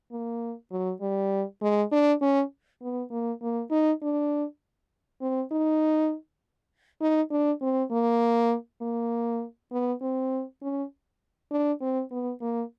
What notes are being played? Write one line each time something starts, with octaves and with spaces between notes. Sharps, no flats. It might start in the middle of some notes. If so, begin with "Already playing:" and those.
A#3
F#3
G3
G#3
D4
C#4
B3
A#3
A#3
D#4
D4
C4
D#4
D#4
D4
C4
A#3
A#3
B3
C4
C#4
D4
C4
B3
A#3